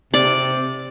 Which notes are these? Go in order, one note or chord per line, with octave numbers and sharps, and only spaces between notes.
C3 D5